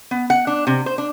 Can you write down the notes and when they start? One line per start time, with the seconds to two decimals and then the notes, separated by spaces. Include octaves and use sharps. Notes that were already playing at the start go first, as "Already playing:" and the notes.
0.11 B3
0.30 F#5
0.47 D4
0.67 C3
0.86 C5
0.98 D4